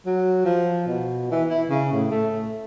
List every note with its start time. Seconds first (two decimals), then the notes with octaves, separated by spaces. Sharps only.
0.06 F#3
0.45 F3
0.87 B2
1.32 E3
1.50 E4
1.70 C#3
1.93 A2
2.11 A3